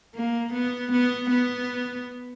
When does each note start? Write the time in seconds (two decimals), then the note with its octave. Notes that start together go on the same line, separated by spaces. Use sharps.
0.15 A#3
0.53 B3
0.92 B3
1.30 B3